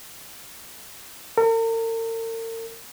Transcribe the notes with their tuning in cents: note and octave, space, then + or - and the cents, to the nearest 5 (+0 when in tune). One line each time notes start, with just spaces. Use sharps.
A#4 -45